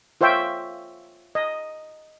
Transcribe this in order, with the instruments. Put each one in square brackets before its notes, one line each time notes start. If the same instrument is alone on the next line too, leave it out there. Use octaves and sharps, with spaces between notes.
[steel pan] F4 C5 C#5 E5 G5
D#5